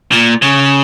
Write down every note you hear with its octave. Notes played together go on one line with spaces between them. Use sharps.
A#2
C#3